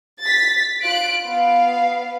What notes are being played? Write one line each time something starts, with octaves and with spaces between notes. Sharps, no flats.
A6 B6
F4 F#6 D7
B3 F5